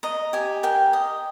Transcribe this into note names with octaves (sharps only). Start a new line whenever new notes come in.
D#5 A#5
G4 G#5
A#4 G5
D#5